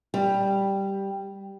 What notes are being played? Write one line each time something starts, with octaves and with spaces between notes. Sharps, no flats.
G3